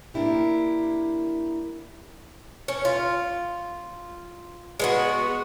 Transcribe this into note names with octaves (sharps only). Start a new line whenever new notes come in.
A#3 D4 E4 G4
C#4
F4
G#3 B3 F#4